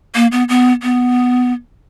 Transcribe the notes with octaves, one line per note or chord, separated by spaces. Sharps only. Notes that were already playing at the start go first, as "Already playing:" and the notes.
A#3
B3
B3
B3